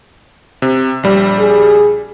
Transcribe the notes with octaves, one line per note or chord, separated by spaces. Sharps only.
C3
A#1 G3
G#4